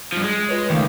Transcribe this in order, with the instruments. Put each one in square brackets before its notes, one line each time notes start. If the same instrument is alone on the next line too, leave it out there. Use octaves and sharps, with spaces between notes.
[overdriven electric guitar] G2 F3
G#3
[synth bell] F4 B4 C#5
[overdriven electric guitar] C#2 [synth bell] D#3 A3 F5